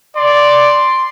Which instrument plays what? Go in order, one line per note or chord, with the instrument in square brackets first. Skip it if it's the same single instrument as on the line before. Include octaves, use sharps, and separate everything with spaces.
[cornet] D5 [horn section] C6